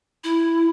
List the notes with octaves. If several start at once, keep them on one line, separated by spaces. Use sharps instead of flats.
E4